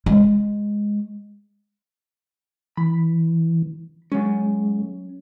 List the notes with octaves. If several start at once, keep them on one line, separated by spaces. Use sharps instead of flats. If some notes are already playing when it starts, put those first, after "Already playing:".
G#3
E3 B5
F#3 G#3 C#4